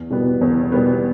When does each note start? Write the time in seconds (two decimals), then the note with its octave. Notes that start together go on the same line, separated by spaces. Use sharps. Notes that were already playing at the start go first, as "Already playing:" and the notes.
Already playing: E2
0.10 B2 G3 B3
0.41 E2
0.72 B2 G3 B3